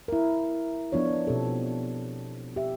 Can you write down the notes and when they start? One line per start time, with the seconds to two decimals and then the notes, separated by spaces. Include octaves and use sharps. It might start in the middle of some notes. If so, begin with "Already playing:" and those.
0.08 E4 A#4
0.92 F3 B3 D4 F4 C#5
1.27 B2 C4 G4 A4
2.56 G4 E5